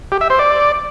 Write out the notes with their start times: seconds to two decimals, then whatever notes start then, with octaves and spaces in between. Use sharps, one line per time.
0.12 G4
0.21 E5
0.30 C5
0.39 D5